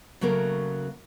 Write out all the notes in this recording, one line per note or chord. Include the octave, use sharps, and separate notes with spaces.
C#3 F#3 A3 A#3 A#4